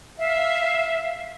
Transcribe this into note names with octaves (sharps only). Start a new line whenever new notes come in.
E5 F5